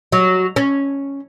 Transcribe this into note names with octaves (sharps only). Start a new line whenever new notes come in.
F#3
C#4